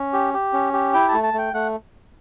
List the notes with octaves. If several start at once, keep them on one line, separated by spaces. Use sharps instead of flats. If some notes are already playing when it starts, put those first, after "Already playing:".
Already playing: C#4
G4
G4
C#4
G4
E4 G5
A3 A5
A5
A3 G5
A3 F#5